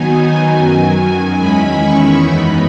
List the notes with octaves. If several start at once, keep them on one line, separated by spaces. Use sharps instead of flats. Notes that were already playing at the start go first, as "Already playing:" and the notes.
Already playing: D#3 F#3 B3 D#4 G#5
G#5
F#2 D#3 F#3 G#5
E2 D#3 G#3 C#4 E4 B5
C#6
F#2 E3 G#3 B3 D#4 B5